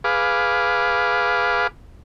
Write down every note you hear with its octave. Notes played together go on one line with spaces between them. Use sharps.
G#4 B4 F5 D6